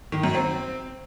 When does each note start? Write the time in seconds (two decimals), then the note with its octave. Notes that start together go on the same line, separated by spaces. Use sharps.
0.12 D#3
0.23 F#2
0.35 C4